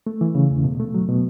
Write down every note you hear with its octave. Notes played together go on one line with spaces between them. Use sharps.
A3
E3
C#3
E2
B2
A3
F#3
B2